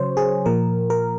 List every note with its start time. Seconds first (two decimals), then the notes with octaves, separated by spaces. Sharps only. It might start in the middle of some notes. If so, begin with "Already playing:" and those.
Already playing: C#3 F#3 C5 C#5
0.17 G#4
0.46 A#2 F3 A#4
0.90 A#4